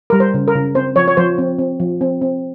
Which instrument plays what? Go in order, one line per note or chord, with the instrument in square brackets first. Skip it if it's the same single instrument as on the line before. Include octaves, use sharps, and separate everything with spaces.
[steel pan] G3 A#4
C5
C#3
A#4
C#3
C4 C5
F3 C#5
C#5
F3 C5
C4
C4
F3
C4
C4